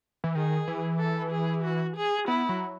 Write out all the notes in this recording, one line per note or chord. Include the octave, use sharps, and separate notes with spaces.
E3
D#3 G#4
E3
A4
G#4
F#4
G#4
B3 E4
F#3